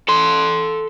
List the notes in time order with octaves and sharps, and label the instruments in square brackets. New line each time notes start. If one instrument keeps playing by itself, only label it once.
[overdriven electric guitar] A4 C6